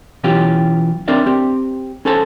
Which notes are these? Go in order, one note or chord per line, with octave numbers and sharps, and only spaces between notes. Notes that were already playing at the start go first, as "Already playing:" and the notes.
B2 E3 F#3 C#4 F4 G4
C4 D4 A#4 D5 E5
C4 G4
C#4 A4 C5 A5